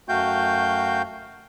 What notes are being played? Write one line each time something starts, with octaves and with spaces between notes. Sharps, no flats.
F#2 A3 F#4 F5 G5 G6